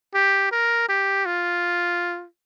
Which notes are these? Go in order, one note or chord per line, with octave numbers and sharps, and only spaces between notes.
G4
A#4
G4
F4